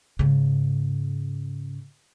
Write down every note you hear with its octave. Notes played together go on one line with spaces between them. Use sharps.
G#2 C#3